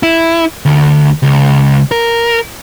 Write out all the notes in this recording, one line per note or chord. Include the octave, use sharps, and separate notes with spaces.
E4
D2
C#2
A#4